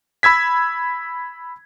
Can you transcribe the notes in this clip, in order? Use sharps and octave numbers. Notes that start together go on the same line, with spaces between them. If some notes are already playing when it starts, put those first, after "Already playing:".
B5 E6 G#6 B6